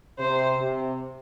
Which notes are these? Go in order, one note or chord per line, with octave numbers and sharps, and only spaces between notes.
C3 C5
C3